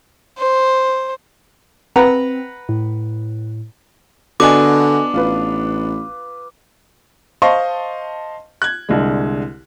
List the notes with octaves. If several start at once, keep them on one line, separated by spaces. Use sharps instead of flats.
C5
C4 B4 F#5 A#5
A2
D3 B3 D4 F#4 D#5 G#5 D6
A1 F4 B4
C5 D#5 F5 A5 C6 C#6
F#6 G#6
C2 D3 G#3